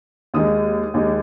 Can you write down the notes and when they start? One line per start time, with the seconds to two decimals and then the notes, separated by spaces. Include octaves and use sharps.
0.34 D#2 D#3 G#3 D#4 D#6
0.94 D#2 D#3 G#3 D#4